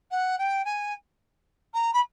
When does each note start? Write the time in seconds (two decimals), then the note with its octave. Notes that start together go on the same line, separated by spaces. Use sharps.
0.11 F#5
0.39 G5
0.65 G#5
1.74 A#5
1.93 B5